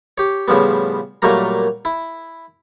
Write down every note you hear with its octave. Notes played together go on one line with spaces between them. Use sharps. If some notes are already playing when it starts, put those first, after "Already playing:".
G4 C#5
A2 C#3 F3 G3 B3
A#2 F#3 G3 A3 A#3 A#5
E4